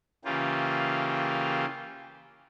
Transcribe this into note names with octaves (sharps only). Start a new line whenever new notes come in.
C#3 E3 A#3 F4 G4